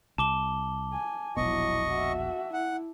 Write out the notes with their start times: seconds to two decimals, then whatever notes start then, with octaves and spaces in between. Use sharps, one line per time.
0.18 C2 A5 D6 G7
0.93 G#5
1.37 E1 A#1 B2 F#3 E4 D#5 C#6
1.90 F#4 E5
2.53 E4 F#5